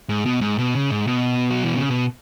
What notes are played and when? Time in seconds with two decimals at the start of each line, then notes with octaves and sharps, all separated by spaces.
0.09 G#2
0.26 B2
0.41 G#2
0.58 B2
0.75 C#3
0.90 G#2
1.07 B2
1.50 F#3
1.63 E3
1.76 C#3
1.89 B2